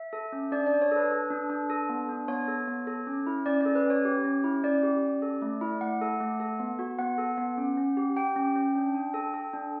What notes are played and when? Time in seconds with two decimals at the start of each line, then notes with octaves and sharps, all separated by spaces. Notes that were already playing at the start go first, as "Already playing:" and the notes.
Already playing: E5
0.13 A4
0.32 C#4
0.52 D4 D5
0.66 D5
0.72 D4
0.82 C#5
0.91 A4 B4
1.11 A4
1.31 D4
1.50 D4
1.70 A4
1.89 B3
2.09 D4
2.28 B3 C#5
2.48 A4
2.67 B3
2.87 A4
3.07 C#4
3.27 E4
3.46 C#4 D5
3.61 A4 D5
3.75 B4
3.85 C#4
3.90 C#5
4.05 G4
4.24 C#4
4.44 E4
4.63 C#4 D5
4.83 G4
5.03 C#4
5.22 A4
5.42 A3
5.61 E4
5.81 A3 F#5
6.01 A4
6.20 A3
6.40 A4
6.60 B3
6.79 F#4
6.99 B3 F#5
7.18 A4
7.38 B3
7.58 C#4
7.77 C#4
7.97 G4
8.16 G4 G5
8.36 C#4
8.56 C#4
8.75 D4
8.95 D4
9.14 A4
9.34 A4
9.53 D4